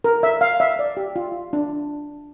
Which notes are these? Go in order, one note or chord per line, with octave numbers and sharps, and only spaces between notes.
A#4
E5
F5
E5
D5
G4
F4
D4